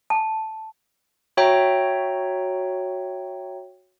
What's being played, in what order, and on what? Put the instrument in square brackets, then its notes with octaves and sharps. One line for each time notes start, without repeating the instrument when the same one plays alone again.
[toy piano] A5
[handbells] F#4 C#5 E5 G5 A#5